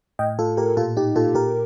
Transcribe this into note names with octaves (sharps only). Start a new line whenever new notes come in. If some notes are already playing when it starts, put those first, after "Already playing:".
A2 D#5 G5
A2 F4 A4
A2 G4 A#4
A#2 F4 A4
A#2 D#4 G4
A#2 F4 A4
A#2 G4 A#4